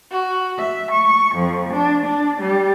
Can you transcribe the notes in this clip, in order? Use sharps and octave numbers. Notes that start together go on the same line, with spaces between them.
F#4
E5
C#6
F2
D4
D4
G3